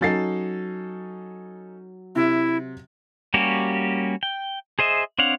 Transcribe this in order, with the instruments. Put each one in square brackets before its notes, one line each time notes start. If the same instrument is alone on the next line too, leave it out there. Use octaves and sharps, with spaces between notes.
[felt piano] F#3 A6 C7 [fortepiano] C#4 D#4 A4
[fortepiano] C3 [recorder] E4
[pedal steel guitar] G3 A#3 C#4 F#4 G4
G5
G#4 C5 D#5 E5
C4 D4 C#5 F5 F#5